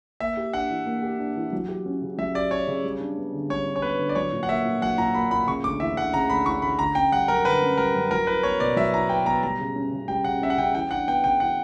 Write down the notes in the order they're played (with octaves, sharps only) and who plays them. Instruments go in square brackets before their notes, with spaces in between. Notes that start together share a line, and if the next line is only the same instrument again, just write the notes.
[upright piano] A#3 [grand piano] E5
[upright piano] G4
[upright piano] D4 [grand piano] F#5
[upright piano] E3
A#3
G4
D4
E3
F#3
G4
C#4
C#3
[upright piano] F#3 [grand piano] E5
[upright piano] G4 [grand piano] D5
[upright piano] C#4 [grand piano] C#5
[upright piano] C#3
G3
D4
B3
D3
[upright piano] G3 [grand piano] C#5
[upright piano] D4
[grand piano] C#5
[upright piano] B3 [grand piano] B4
[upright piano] D3
[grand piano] D5
[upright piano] F#3 [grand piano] C#5
[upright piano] A#2
[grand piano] F#5
[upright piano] A#3 [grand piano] E5
[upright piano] A#2
[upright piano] F#3 [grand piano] F#5
[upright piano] A#2 [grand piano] A#5
[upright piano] A#3 [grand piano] B5
[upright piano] A#2 [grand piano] B5
[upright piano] C#3 [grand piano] C#6
[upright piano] D2 [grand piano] D6
[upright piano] E3 [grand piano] E5
[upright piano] D2 [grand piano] F#5
[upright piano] C#3 [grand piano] A#5
[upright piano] D2 [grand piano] B5
[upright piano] E3 [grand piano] C#6
[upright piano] D2 [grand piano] B5
[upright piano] D3 [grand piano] A#5
[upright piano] C#4 [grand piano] G5
[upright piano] G3 [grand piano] F#5
[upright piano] F#2 [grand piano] A#4
[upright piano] D3 [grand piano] B4
[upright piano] C#4
[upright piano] G3 [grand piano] A#4
[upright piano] F#2
[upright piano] F#3 [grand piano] A#4
[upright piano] E4 [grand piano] B4
[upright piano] B3 [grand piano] C#5
[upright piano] B2 [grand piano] D5
[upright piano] F#3 [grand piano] E5
[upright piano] E4 [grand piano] A#5
[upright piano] B3 [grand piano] G5
[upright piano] B2 [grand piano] A#5
[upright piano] G3 [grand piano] A#5
[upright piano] C#3
C#4
C#3
[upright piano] G3 [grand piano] G5
[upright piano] C#3 [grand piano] F#5
[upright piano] C#4 [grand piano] E5
[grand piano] F#5
[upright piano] C#3 [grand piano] G5
[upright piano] E3 [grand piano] G5
[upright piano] D4 [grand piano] F#5
[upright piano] B3 [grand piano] G5
[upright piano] C#3 [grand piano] G5
[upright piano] E3 [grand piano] F#5